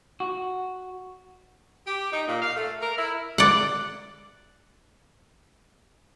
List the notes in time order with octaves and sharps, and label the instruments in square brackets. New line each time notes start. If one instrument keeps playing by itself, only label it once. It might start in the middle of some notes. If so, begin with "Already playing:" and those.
[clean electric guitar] F#4
[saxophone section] G4
D#4
A#2
F5
A3
A#4
E4
[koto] D5 F#5